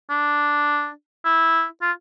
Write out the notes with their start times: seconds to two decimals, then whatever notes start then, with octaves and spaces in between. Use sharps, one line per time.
0.10 D4
1.25 E4
1.82 F4